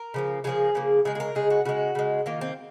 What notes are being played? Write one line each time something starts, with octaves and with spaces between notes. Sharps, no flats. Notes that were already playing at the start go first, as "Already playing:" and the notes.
Already playing: A#4
C#3 F3 A#3
C#3 F3 A#3 G#4
C#3 F3 A#3
C#3 G#3 G#4
G#4
A#4
C#3 G#3 G#4
F#4
C#3 G#3 F#4
C#3 G#3
D#3 A#3 F4
C4